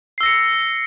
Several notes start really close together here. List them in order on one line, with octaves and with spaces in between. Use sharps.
C7 E6 A#6 C#7